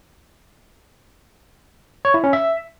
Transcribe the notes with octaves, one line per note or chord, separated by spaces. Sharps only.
C#5
E4
C#4
E5